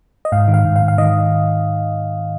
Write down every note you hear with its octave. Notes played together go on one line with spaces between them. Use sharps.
D#5
G#2 F5
D#3
F5
G#2
F5
G#2
F5
D#3 D#5